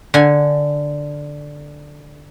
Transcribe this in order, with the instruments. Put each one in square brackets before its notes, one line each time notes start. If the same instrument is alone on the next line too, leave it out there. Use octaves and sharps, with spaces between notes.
[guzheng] D3 G#5